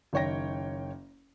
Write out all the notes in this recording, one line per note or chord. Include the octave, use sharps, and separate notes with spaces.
F#1 D#3 C#5 G5 A#6